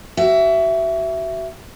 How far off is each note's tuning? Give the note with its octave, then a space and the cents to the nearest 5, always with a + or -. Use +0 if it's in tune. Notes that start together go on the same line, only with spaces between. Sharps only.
F#4 +35 E5 +10